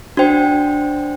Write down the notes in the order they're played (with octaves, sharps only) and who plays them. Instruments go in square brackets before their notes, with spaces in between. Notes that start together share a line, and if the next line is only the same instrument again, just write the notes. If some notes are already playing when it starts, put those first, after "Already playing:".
[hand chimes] D4 F#4 C5 G5